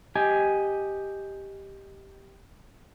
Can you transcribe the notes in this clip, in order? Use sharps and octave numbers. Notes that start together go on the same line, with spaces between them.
G4 D#5 G#5